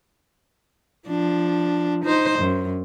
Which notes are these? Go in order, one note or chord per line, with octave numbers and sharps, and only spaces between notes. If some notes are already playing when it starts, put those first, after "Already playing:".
F3 D4
D#4 C5
F#2